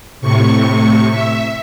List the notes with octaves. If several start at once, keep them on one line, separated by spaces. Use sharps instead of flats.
A2 C3 C#6
E5